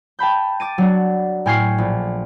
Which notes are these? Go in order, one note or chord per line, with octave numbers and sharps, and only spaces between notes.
G5 A5 B5 G6
D6 A6 D#7
F#3 D4 F#4
A2 G5 G#5 C#6 F6 C7
A#1